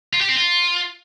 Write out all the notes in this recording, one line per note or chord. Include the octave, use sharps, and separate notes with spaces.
F4
G4
C4
F4